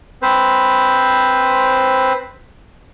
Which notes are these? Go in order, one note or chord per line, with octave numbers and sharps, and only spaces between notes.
C4 B4 C5